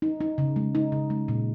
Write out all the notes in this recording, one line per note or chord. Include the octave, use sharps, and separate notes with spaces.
D#4
D#4
C#3
G#3
D#4
C#3
G#3
A#2